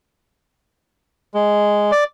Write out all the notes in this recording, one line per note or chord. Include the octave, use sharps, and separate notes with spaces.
G#3
D5